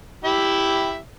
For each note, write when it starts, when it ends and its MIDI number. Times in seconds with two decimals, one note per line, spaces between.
0.25 0.97 64
0.25 0.97 67
0.25 0.97 76